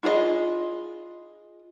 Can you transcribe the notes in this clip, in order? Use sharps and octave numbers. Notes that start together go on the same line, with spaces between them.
E4 F4 G#4 C#5 D#5